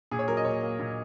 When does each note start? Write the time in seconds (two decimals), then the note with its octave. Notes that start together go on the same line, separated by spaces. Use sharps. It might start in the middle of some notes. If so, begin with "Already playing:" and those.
0.11 A#2 G#4
0.19 C#5
0.28 F#3 A#4
0.37 D#5
0.45 A#2 C#5
0.62 A#3
0.80 A#2